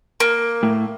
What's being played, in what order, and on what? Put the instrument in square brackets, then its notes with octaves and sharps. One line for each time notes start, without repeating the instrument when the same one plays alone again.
[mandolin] A#3
[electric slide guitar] A2